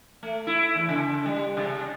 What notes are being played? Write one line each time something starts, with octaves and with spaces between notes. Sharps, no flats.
A3
E4
E2
C#3
G3
C3